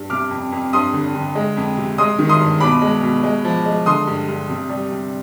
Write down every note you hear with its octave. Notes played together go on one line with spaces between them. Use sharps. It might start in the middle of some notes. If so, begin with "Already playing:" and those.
Already playing: G2
C3 D6 F6
F2
F2
G2 C6 D#6
D3
D3
G#3
F2
C3
G#3 C6 D#6
D#3
C6 D#6
G2
B2 B5 D6
G#3
B2
G#3
F3
G#3
D3 C6 D#6
G2
G2
C3
G3
C3